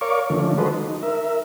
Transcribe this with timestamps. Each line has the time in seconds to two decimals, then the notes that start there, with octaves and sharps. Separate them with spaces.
0.01 A#4 C#5 D5 F5 C#6 D6
0.30 D3 D#3 F3 A3 C#4
0.58 G#3 F#4 A4 B4 C5 D#5
0.74 D#4
1.03 A#4 E5